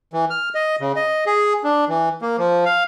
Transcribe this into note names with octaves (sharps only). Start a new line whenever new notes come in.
E3
F6
D#5
C#3
D#5
G#4
D4
E3
A#3
F3
F5